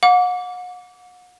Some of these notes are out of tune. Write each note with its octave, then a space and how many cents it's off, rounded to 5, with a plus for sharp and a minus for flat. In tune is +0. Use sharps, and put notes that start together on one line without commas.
F#5 -40 D6 -30